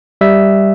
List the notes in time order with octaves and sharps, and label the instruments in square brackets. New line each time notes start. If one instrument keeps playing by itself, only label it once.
[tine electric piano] G3 E5